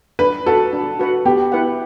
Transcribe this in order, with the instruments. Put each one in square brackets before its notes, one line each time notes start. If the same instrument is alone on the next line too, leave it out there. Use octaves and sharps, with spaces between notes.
[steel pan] D4 [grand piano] B4
[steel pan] F#4 B4 F#5 [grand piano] A4
[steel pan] D4
F#4 B4 F#5
[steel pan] B3 [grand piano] G4
[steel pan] E4 B4 F#5